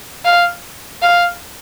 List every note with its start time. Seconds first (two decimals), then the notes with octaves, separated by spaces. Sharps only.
0.25 F5
1.02 F5